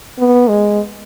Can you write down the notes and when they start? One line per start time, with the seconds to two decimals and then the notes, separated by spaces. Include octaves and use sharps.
0.18 B3
0.49 G#3